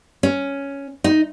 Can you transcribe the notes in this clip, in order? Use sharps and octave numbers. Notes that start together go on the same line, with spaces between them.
C#4
D#4